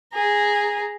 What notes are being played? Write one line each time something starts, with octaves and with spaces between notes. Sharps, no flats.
G#4 A#5